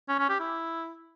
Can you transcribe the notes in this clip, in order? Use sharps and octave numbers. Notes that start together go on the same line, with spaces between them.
C#4
C#4
G4
E4